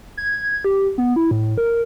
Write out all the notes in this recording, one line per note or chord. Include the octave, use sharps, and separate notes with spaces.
G#6
G4
B3
E4
A2
A#4